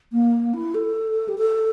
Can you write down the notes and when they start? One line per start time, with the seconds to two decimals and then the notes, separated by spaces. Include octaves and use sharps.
0.12 A#3
0.54 E4
0.75 A4
1.28 G4
1.38 A4